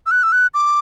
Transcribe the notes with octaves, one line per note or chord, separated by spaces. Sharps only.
E6
F#6
E6
F#6
D6